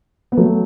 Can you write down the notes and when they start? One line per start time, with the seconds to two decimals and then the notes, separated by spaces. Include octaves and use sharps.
0.32 B3
0.37 F#3 A3